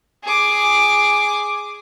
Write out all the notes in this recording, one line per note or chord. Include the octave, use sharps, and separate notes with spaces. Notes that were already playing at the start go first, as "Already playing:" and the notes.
G#4 D6